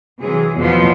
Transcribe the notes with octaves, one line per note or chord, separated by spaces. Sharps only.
C3 E3 F#3 G#4
E2 B2 F3 F#3 B3